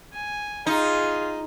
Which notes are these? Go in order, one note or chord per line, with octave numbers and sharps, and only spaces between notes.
G#5
D#4 F4 G#4